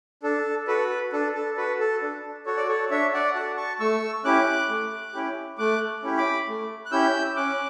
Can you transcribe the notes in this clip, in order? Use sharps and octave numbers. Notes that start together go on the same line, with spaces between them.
D4 A4
F#4 A4 B4
D4 A4
A4
F#4 A4 B4
A4
D4
F#4 A4 C#5
D5
A4 C#5
D4 C#5 E5
D5 F#5
F#4 A4 F#5 A5
A5 C#6
A3 C#6 E6
C#4 E4 G4 D6 F#6
A3
C#4 E4 G4
A3 D6 F#6
C#4 E4 G4
B5 D6
A3
F#6
C#4 E4 G4 E6 G6
C#4 D6 F#6